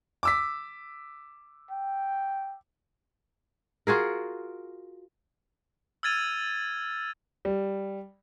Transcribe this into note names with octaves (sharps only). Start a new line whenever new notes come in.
D6 E6 B6
G5
F4 F#4 G#4 A#4
E6 F6 G#6 A6 D#7 F7
G3